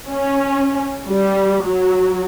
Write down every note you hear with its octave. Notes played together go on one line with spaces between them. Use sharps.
C#4
G3
F#3